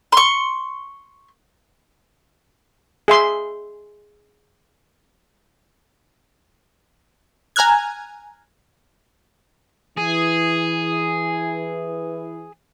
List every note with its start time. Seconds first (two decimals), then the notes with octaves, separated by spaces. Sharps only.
0.12 C6 C#6
3.08 G#4 E5 C6
7.56 G#5 A#5 F6 F#6 G#6
9.98 E3 G#4